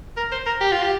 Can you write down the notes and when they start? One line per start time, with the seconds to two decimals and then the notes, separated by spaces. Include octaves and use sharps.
0.17 A#4
0.32 C5
0.46 A#4
0.61 G4
0.72 F4
0.83 G4